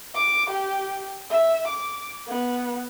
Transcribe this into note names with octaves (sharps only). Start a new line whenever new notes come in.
D6
G4
E5
D6
B3